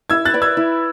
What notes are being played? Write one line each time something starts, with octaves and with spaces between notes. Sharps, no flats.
E4 E6 G#6
F#6 A6
B4 D5
E6 G#6
E4